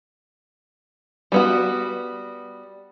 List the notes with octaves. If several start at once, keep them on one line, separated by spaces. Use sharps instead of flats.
G3 B3 F#4